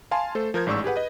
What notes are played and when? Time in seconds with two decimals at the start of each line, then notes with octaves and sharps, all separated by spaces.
0.11 F5 G#5 A5 C6
0.35 A3 A4 C5
0.54 F3 A#4 G6 G#6
0.67 A1 G#2 D5 C#6 E6
0.84 G4 G#4 B4 F#5
0.96 B4 D#5